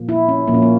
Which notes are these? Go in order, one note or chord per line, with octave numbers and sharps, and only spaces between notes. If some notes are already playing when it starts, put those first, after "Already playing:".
Already playing: A#2 F3 A#3
E4
C#4
A#2 F3 A#3
C#4
A#3